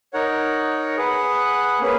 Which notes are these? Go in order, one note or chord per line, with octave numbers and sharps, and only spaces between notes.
D#4 A#4 C#5 F#5
G#4 B4 F#5
A#3 C#4 G#4 B4